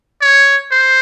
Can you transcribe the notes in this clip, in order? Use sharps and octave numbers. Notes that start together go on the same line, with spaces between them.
C#5
C5